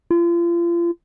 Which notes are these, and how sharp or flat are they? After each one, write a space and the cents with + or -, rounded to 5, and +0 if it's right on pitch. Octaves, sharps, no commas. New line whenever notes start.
F4 -35